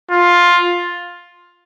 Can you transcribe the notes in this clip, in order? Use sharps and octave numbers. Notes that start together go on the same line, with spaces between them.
F4